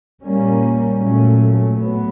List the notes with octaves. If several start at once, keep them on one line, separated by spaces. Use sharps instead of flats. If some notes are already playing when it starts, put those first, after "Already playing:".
A#2 G3 A#3 C#4
A#2 F#3 A3 C#4
A2 F#3 B3